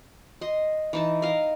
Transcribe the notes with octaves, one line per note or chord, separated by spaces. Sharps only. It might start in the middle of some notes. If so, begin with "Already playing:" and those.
D#5 C6
E3 D#4 A5
A#4 D#5 F5